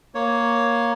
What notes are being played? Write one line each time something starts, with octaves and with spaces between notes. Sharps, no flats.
A#3 C#5